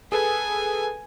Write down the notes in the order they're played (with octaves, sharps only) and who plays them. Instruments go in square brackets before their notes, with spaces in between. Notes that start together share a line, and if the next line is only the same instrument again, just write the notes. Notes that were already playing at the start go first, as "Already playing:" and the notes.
[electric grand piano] G#4 A4 B4 [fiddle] G#5